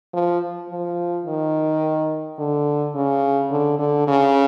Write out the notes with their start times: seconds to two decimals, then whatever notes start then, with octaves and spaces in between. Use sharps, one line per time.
0.13 F3
0.70 F3
1.26 D#3
2.38 D3
2.95 C#3
3.51 D3
3.79 D3
4.07 C#3